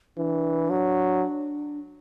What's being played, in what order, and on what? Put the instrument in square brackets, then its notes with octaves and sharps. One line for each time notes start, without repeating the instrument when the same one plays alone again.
[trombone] E3 [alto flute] D4
[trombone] F#3